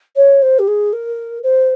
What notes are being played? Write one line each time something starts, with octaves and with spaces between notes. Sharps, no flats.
C#5
C5
G4
G#4
A#4
C5